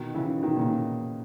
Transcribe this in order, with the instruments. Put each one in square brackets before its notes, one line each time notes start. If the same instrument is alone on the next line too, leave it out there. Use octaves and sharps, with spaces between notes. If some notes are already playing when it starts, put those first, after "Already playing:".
Already playing: [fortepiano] B2 D#3
C#3 E3
B2 D#3
A#2 C#3